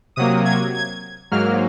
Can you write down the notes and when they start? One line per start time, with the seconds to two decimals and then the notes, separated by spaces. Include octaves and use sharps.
0.16 C3 F#3 A#3 D#6
0.45 G#6
0.74 G#6
1.31 G#2 F#3 A#3 F6